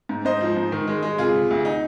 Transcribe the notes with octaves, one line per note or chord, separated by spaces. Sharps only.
G#2
G#2 C5 D#5
F3
G#2
D#3
G#3
G#3
C3 F4 G#4
C3
D2
D#4